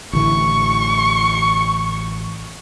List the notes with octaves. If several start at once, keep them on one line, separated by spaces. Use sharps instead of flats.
A1 D3 E3 C#6